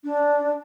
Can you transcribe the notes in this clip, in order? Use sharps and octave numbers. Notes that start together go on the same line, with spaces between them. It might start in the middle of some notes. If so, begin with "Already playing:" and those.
D4